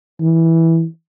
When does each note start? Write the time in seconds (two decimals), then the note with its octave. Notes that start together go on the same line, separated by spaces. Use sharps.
0.21 E3